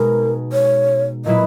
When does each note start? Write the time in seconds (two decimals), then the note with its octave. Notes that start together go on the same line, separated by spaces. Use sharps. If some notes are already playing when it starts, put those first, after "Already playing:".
Already playing: B2 G#3 D#4 A#4
0.53 C#5
1.25 A#2 F#3 A#3 E4 B4 D#5